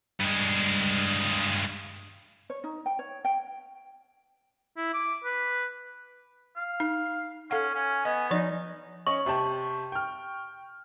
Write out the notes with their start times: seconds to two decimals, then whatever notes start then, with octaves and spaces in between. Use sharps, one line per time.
0.20 G2 G#3
2.50 C#5
2.64 D#4
2.86 G5
2.99 C#5
3.25 G5
4.77 E4
4.94 D6
5.24 B4
6.57 F5
6.80 D#4
7.51 C#4 A4 F5 F#5
7.74 C#4 G#5
8.05 B3 D#5
8.31 F3 D#4 D5
9.07 C#4 C#5 D#5 C#6
9.26 C3 G4 A5
9.92 G5 F6